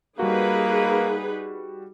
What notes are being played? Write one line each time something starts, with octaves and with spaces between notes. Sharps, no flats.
G3 A#3 D#4 F#4 G#4 B4